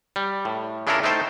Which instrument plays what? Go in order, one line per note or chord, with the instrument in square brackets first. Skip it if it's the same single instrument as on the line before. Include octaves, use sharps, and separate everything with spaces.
[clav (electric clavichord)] G3
A2
C#3 D4 E4 F4 A4 A#4
A3 D#4 E4 C5 G5 A5